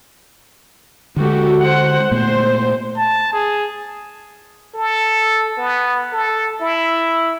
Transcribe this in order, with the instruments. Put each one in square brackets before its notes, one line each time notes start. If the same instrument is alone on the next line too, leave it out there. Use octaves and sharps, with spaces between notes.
[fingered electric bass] D3 G#3 [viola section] F#4 G4 A4
[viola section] C5 F#5
[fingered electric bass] A#2 A3 B3 [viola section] C5
[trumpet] A5
G#4
[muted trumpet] A4
B3
A4
E4